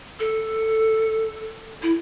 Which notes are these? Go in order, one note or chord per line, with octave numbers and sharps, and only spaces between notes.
A4
E4